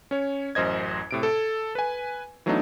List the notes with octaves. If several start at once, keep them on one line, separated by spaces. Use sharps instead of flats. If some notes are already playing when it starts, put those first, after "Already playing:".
C#4 C#5
A1 F#2 C5 D#5 G#6
A2 C3 D7
A4
B4 G#5
E3 F#3 A3 B3 D4 D#4